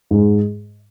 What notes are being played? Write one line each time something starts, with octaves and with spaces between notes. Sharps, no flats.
G#2